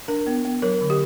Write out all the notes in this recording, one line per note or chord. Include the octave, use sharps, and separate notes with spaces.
D4 A#4
B3
B3
F#3 A#4
D3
G4